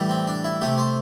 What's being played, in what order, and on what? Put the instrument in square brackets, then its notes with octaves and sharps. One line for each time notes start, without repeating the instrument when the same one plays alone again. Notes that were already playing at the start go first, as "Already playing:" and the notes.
Already playing: [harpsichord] A2 E3 G3
C4
D4
E4
C3 A3 G4
C5